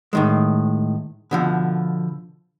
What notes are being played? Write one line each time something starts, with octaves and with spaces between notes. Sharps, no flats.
A2 D#3 G#3
B2 D3 F3